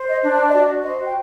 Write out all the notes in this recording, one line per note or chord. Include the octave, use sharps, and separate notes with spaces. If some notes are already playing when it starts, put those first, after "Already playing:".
Already playing: C5
D#5
D4
D5
D#5
F#4 D5
C5 D#5
G5